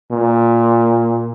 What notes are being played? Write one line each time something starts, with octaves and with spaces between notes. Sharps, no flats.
A#2